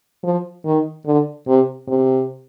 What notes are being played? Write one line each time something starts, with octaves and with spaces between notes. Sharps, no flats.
F3
D#3
D3
C3
C3